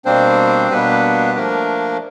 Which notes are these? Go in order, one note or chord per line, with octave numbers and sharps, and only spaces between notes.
B2 G3 A#3 C4 D4 C5
B2 G3 A#3 B3 D4 B4
F3 A3 A#3 D4 A#4